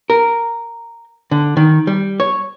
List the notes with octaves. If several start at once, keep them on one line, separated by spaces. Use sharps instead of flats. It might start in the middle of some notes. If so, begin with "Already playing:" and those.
A#4
D3
D#3
G3
C#5